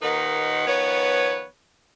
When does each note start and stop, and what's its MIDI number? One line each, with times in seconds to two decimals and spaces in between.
0.02 0.66 39
0.02 0.66 46
0.02 0.66 51
0.02 0.66 63
0.02 0.66 71
0.02 0.66 78
0.67 1.45 51
0.67 1.45 53
0.67 1.45 59
0.67 1.45 71
0.67 1.45 73